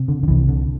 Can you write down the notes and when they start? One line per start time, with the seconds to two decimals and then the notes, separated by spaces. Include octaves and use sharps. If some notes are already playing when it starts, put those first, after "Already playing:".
Already playing: C3
0.08 D3
0.23 D3
0.28 C2 C3 E3
0.48 D3